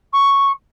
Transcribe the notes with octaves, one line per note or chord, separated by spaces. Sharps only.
C#6